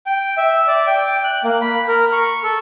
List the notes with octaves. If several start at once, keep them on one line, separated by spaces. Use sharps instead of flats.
G5
E5
D5
G5
F#6
A#3
B5
A#4
C#6
A4